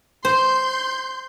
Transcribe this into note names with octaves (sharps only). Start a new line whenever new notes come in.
C5 C6 G6